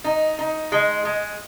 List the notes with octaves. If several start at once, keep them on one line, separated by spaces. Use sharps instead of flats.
D#4
D#4
G#3
G#3